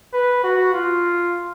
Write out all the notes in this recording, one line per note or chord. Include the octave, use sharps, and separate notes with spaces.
B4
F#4
F4